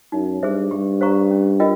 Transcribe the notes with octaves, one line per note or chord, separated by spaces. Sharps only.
F#2 D#4
G2 G#4 C5 E5
G2 G4
C5 F5 A#5 C#6
C#4
F4 A#4 D#5 G5